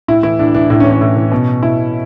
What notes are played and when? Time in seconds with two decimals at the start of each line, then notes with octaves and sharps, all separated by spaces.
0.08 A2 E4
0.23 E3 E4
0.39 A2 D4
0.54 E3 D4
0.70 A2 D4
0.80 C#4
0.85 E3
0.91 C#4
1.01 A2
1.16 E3
1.32 B2
1.63 B2 E4